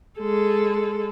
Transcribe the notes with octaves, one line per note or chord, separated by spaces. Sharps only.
G#3 A4